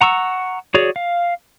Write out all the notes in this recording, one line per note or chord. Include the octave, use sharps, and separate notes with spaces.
F#5 A#5 C#6 E6
F#4 G#4 C#5 D5
F5